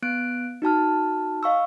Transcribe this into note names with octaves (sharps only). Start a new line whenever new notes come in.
B3 F#6 D7
D#4 F#4 A5 F6
D#5 F5 C#6 E6